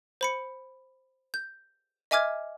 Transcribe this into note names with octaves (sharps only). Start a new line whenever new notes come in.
C5 B5 C#7
G6
D#5 E5 G#5 D6 F6 G#6